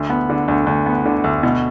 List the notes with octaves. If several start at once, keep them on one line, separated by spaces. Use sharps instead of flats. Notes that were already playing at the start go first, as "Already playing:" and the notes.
Already playing: D2
B3
D3
D2
D2
B3
D3
D2
B2